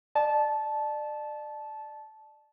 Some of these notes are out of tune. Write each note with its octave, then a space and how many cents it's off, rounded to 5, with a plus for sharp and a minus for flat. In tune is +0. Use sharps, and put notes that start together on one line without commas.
D5 +35 A5 -15